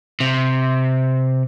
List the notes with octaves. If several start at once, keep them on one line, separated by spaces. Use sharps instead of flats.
C3